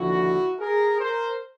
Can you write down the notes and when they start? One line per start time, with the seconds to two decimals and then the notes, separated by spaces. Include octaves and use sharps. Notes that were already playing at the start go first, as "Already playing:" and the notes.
Already playing: D#2 D3 F3 E4 F#4
0.60 G#4 A#4
0.99 A#4 C5